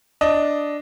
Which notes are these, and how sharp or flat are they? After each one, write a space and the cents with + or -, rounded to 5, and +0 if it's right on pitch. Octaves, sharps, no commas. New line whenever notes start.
D4 +0 D#5 +5